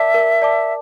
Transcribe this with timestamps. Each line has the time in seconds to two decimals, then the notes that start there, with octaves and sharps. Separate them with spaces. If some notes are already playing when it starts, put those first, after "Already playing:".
Already playing: A#4 D5 E5 A5 D6
0.14 A#4
0.42 D5 A5 D6